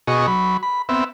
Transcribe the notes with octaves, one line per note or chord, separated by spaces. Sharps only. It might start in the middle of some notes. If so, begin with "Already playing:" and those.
B2 F#4 G#4 D#5 C#6
F#3 B5
B5
B3 C4 E5